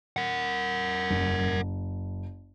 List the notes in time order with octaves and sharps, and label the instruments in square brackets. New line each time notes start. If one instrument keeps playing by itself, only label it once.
[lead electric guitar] A#4 F#5
[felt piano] F#1